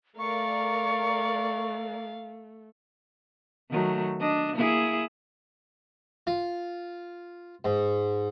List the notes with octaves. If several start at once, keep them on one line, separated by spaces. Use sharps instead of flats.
A3 A#4 D5 F5 C#6
D#3 F#3 A3
D4 D#5
A#3 E4 G#4
F4
G#2